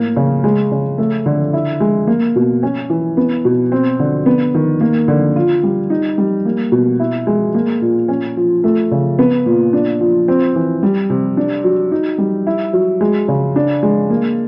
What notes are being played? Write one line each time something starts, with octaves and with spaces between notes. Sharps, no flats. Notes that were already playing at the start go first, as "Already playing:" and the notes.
Already playing: A2 A#3
C#3
G#3
C#3
A3
D3
E4
G#3
A#3
B2
C#4
E3
B3
B2
C4
D3
B3
D#3
A#3
D3
F4
G3
D#4
G3
A#3
B2
E4
G#3
A#3
A#2
C#4
F3
A3
C#3
B3
A#2
D4
F3
C4
E3
G3
C3
D4
F#3
D#4
G3
E4
F#3
G#3
C#3
D4
G#3
A#3